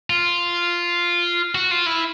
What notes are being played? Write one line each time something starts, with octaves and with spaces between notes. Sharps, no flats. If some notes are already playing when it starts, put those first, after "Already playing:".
F4
F#4
F4
E4